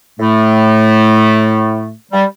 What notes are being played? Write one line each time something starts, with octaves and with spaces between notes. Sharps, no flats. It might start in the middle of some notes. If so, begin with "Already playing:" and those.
A2 A3
G3